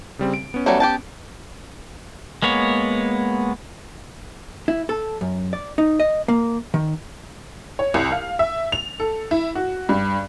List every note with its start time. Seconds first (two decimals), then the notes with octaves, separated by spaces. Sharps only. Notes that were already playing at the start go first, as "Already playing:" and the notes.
0.19 C#3 G3 C4
0.34 D7
0.54 B3 C#4
0.66 F#3 G3 A3
0.80 G4 G5 A5
2.42 G#3 A#3 B3 C#5
4.68 E4
4.89 A4
5.21 F#2
5.53 D5
5.78 D#4
6.00 D#5
6.28 A#3
6.74 D#3
7.79 C#5
7.94 C2
8.12 F5
8.39 E5
8.72 F7
9.00 A4
9.31 E4
9.55 F#4
9.89 G2